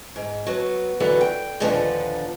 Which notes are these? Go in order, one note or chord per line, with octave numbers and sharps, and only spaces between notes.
G#2
F#3 B3
D3 E3 F#3 B3
G5
D#2 A#2 D3 F3 B3 D4